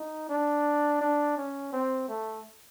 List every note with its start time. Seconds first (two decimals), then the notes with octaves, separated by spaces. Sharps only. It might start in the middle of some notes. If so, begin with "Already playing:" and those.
Already playing: D#4
0.29 D4
1.01 D4
1.37 C#4
1.72 C4
2.08 A3